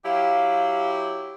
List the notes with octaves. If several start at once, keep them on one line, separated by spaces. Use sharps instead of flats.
F#3 E4 G4 F5